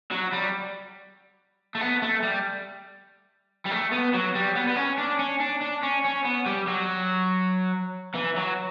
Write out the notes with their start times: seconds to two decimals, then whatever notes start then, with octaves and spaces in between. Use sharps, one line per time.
0.12 F#3
0.33 G3
1.75 A3
1.81 B3
2.02 A3
2.23 G3
3.65 G3
3.71 A3
3.92 B3
4.13 F#3
4.35 G3
4.56 B3
4.68 B3
4.76 C#4
4.98 D4
5.19 C#4
5.40 D4
5.61 D4
5.82 C#4
6.04 C#4
6.25 B3
6.46 G3
6.67 F#3
8.15 E3
8.37 F#3